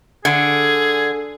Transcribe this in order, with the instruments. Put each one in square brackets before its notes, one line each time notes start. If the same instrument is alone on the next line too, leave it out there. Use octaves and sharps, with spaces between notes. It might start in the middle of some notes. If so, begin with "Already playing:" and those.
[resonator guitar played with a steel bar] D3 [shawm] G#4